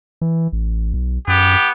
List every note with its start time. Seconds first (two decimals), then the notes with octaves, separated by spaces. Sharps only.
0.21 E3
0.53 A1
0.93 B1
1.28 F#2 B3 G4